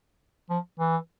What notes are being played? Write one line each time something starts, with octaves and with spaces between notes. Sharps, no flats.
F3
E3